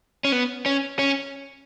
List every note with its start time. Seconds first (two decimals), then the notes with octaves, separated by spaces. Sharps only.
0.25 C#4
0.32 B3
0.66 C#4
0.99 C#4